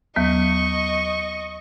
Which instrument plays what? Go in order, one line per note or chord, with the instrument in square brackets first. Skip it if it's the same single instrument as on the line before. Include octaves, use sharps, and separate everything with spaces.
[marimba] D#2 F#3 B3 [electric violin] D#5 C#6